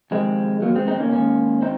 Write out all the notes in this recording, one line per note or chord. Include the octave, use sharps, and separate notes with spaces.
F2 C3 D#3 G#3 C4
F#3 A#3
G#3 C4
C4 D#4
A#3 C#4
G#2 D#3 A#3 C#4
C4 D#4